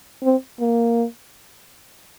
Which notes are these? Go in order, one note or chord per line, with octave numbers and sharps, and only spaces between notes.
C4
A#3